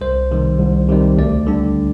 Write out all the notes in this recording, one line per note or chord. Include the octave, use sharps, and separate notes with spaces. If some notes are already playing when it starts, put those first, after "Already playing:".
C2 C5
C3 D#3 G3
C2
C3 D#3 G3
D2 D5
D3 G3 D4